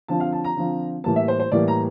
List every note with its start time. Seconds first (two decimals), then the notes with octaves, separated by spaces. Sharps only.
0.08 D3 F3 C4 F4 A5
0.20 F5
0.33 A5
0.44 A#5
0.56 D3 F3 C4 F4
1.04 A2 E3 G3 A#3 A5
1.16 E5
1.28 C5
1.40 C5
1.52 A2 E3 G3 A#3 D5
1.68 A#5